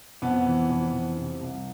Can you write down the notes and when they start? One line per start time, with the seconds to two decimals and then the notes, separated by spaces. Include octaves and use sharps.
0.22 F2 B3
0.46 E3
0.69 F2
0.93 E3
1.17 C3
1.40 C2